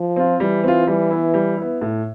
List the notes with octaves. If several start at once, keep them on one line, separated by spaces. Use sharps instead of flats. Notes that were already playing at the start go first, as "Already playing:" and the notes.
Already playing: F3
C4 F4
E3 G3
C4 F4
E3 G3
B3 E4
G3
B3 E4
A2